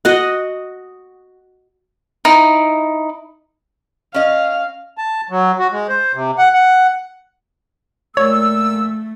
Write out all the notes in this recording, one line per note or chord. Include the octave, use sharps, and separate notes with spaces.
F#4 D#5 F#5
D#4 E4
C#4 D#5 F5
A5
F#3
F#4
G#3
C5
C3
F#5
F#5
A#2 A3 C#5 E6